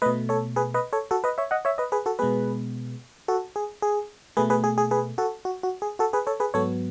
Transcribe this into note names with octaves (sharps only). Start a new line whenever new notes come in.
B2 A3 B4 D#5
A4 C#5
G#4 B4
B4 D#5
A4 C#5
F#4 A4
B4 D#5
C#5 E5
D#5 F#5
C#5 E5
B4 D#5
G#4 B4
F#4 A4
B2 G#3 B3 G#4 B4
F#4 A4
G#4
G#4
B2 A3 G#4 B4
G#4 B4
G#4
G#4
G#4 B4
F#4 A4
F#4
F#4
G#4
F#4 A4
G#4 B4
A4 C#5
G#4 B4
G#2 F#3 B3 A4 C#5